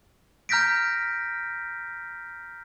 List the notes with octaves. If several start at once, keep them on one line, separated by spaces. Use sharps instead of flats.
A#5 F6 G6 A#6 B6 D7